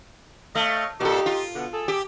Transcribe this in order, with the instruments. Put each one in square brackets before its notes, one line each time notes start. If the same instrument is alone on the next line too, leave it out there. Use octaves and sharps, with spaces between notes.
[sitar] A3 [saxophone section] C#5 D#5 F5
[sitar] A#2 A4 [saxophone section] D#4 G4
[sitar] F4
[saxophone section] B2 D3 B3
G#4 A4
[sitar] G4